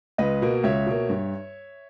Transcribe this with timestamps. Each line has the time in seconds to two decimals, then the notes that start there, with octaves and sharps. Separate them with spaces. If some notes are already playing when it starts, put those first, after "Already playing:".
0.18 C#2 B4 D#5
0.42 B2 A#3
0.63 C#2 C#5 E5
0.86 B2 A#3
1.09 G2